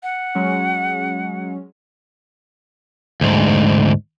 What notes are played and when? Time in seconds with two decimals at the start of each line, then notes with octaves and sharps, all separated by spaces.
0.03 F#5
0.35 F#3 G#3 C#4
3.21 D2 G#2